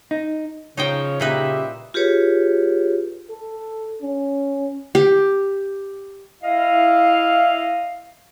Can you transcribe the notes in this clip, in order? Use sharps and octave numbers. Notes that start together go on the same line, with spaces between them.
D#4
C#3 F3 D#4 C5 C#5 G5
A#2 G3 D#4 E4 G4 B4 C5 E5
F4 G4 G#4 B4 C#5
A4
C#4
G4
E4 D#5 F5